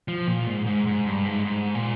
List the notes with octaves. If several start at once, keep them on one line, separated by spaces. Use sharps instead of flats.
F3
A#2
G#2
G#2
G#2
G2
G#2
G#2
A#2